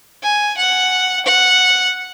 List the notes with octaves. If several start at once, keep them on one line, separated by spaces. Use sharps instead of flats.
G#5
F#5
F#5